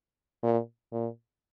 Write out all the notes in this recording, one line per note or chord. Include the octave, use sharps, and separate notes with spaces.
A#2
A#2